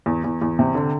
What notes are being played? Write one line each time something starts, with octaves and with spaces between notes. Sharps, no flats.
E2
E2
E2
C3
D3